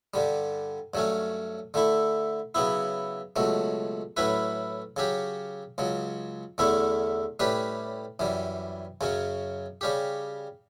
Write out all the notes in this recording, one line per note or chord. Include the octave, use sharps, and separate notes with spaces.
G2 D3 G3
G2 F#3 A3 C#4
D3 A3 E4
C#3 F#3 B3 E4
C#2 B2 F#3 A3
A2 F#3 C#4 E4 B4
C#3 F#3 C#4 G4
C#2 C#3 F#3
E2 D3 A3 C#4 E4
A2 G3 C#4 G4 B4
F#2 E3 G3
F#2 C#3 F#3 C#4
C#3 G3 C#4 G4